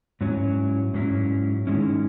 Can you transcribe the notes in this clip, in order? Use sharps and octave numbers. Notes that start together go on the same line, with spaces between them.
G#2 F#3 C#4 E4
G#2 F#3 C#4 E4
G#2 D#3 G#3 C#4 E4